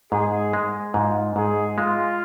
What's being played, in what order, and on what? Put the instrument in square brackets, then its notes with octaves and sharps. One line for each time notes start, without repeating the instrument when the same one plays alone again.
[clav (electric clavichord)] G#2 [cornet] G#4
[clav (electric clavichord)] G#3
[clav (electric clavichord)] G#2 [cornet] F4
[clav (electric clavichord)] G#2 [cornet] G#4
[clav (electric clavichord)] G#3 [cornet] F4